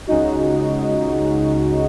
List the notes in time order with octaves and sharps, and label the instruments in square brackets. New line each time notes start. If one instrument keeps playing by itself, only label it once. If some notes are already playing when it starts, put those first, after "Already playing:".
[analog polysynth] C#2 C#3 G#3 D#4 F#4